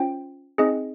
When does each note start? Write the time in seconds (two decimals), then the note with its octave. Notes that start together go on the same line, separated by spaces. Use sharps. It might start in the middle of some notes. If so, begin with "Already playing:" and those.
Already playing: C#4 F4 C5 G5
0.58 C4 D#4 G#4 D#5